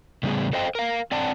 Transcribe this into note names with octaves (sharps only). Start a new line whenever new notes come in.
A2 C#3 G3 B3 G#4
A4 C5 D#5 F5 G5
A#4 F5
C4 D5 F#5 A5